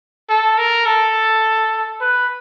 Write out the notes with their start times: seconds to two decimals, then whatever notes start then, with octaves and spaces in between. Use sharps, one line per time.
0.29 A4
0.58 A#4
0.86 A4
2.01 B4